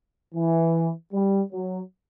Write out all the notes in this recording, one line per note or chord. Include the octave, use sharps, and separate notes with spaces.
E3
G3
F#3